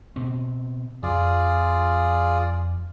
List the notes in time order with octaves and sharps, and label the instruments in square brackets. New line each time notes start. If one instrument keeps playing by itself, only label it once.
[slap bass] B2 C4
[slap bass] F2 [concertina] F4 G#4 D5